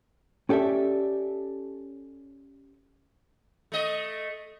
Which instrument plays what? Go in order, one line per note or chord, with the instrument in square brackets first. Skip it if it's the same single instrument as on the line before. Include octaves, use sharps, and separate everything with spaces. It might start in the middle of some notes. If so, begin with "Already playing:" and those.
[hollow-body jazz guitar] C#4 G4 A4 D5 E5
[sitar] A3 D#5